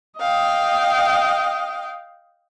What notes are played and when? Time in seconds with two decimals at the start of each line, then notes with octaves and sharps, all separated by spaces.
0.19 D#5 F5 G5